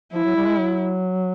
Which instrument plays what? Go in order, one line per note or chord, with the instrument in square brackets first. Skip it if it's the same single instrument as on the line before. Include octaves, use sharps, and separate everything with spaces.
[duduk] F3 [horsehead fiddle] E4
[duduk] F#3
G3
G#3
F#3